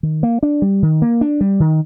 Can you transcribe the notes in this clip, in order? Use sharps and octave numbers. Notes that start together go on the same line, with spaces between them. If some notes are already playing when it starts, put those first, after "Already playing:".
D#3
A#3
D4
G3
D#3
A#3
D4
G3
D#3